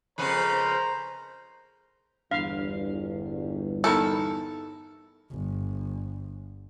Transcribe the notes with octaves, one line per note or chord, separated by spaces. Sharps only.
F2 C#3 B3 A#4 C5 A#5
G1 E2 G2 D4 F5
B3 D#4 E4 A4 A#4 B5
G1